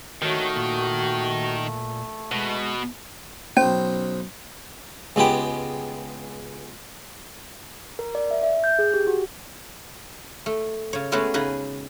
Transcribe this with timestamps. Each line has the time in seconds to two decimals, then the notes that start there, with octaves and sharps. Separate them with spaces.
0.22 D#3 A3 F#4 A#4 C#5
0.56 A#2
2.32 B2 G#3
3.57 B1 C#4 C5
5.16 C#2 G#3 B3 G4 G5
7.99 A#4
8.15 D5
8.31 E5
8.43 E5
8.64 G6
8.79 G#4
8.94 G4
9.07 F#4
10.46 A3
10.93 C#3 C#5
11.12 G#3 A3 B3 C#4 F#4 G#4
11.34 C#3 D#4 G#4 B4